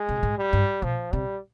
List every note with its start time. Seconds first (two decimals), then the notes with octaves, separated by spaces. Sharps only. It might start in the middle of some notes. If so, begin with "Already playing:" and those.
Already playing: G#3
0.09 C3
0.16 B2
0.23 G#2
0.38 G3
0.53 G2
0.82 B2 F3
1.12 C3 G3